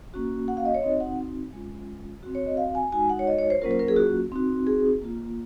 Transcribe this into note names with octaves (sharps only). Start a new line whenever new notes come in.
A#3 C#4 F#4
F#5
F5
D#5
C#5
C4 D#4 F#4 D#5
F#5
G#3 C#4 F4
C4 F#4
C#5
D#5
F5
G#5
G#3 D#4 F#4 G#5
F#5
C#5
D#5
C#5
C5
F#3 A#3 C#4 F4 A#4
C5
A#4
G#4
F#4
C4 D#4 F#4
G#4
A#3 F4